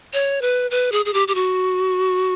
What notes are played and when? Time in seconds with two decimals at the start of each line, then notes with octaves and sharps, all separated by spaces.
0.13 C#5
0.41 B4
0.71 B4
0.92 G#4
1.05 G#4
1.14 G4
1.28 G4
1.35 F#4